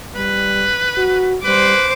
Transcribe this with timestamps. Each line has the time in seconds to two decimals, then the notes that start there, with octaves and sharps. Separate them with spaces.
0.15 G3 B4
0.98 F#4
1.44 G3 B4 C5 D6